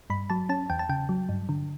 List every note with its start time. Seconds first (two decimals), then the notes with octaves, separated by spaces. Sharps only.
0.10 G2 B5
0.30 F#3 A5
0.49 C#4 A5
0.70 E2 G5
0.79 A5
0.89 C#3 G5
1.09 F#3
1.29 G2
1.49 D3